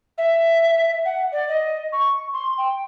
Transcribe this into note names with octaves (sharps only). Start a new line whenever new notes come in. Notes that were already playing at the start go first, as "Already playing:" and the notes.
E5
F#5
D5
D#5
C#6
C6
G5